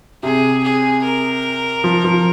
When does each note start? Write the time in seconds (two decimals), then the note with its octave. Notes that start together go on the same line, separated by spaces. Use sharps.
0.23 C3 G#4
0.64 G#4
1.04 A#4
1.84 F3
2.04 F3